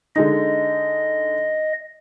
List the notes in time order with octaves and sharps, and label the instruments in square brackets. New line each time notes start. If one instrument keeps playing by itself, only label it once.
[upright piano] D3 G#3 D#4 [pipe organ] D#5